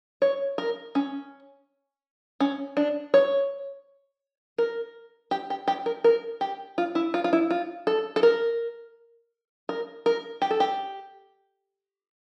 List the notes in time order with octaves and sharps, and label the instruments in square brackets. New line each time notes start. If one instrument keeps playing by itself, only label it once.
[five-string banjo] C#5
A#4
C#4
C#4
D4
C#5
A#4
G4
G4
G4
A#4
A#4
G4
F4
E4
F4
F4
E4
F4
A4
A4
A#4
A#4
A#4
G4
A4
G4